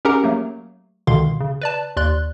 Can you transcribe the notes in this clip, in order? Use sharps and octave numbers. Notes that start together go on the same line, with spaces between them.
C#4 G4 G#4 A#4 F#5 A#5
F#3 A3 A#3
C#2 B2 D3 D#3 F5 C6
C#3
B4 D5 A5
D#2 D5 C6 F#6